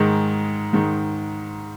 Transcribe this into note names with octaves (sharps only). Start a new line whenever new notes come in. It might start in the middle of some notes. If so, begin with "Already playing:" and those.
Already playing: G#2 D#3 G#3
G#2 D#3 G#3